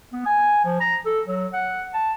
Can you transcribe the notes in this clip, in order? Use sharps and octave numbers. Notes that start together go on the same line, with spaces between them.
B3
G#5
F3
A#5
A4
F#3
F#5
A5